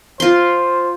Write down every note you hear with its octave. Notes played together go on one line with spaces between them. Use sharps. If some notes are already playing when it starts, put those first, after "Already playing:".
F4 C5 C6